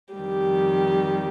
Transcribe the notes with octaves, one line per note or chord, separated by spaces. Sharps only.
F2 D#3 G3 G4